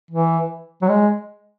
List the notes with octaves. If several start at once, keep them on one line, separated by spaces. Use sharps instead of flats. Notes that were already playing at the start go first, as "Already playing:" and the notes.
E3
F#3
G#3